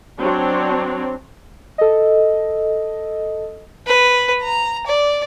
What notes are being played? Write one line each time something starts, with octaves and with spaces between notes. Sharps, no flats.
F#3 C4 D4 C#5
A4 D#5
B4
A#5
D5